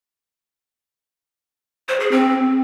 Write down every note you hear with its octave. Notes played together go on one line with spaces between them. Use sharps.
C5
G#4
C4